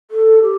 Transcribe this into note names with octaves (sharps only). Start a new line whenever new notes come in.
A4
G4